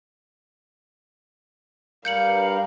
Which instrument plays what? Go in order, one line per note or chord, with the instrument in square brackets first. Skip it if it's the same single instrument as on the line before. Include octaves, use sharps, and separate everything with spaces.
[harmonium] G2 G3 A#4 [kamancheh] F5 [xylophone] G6 C#7 F#7